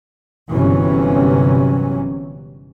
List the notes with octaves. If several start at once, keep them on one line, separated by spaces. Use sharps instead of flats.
G1 C3 E3 F#3 C#4